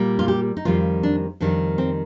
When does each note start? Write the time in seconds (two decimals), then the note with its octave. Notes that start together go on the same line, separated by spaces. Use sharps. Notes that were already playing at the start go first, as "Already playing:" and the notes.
Already playing: A#2 G3 A#3
0.19 F4
0.28 G4
0.57 D#4
0.65 F2 D#3 G3 F4
1.03 D4
1.40 F2 D#3 G3 D4
1.78 C4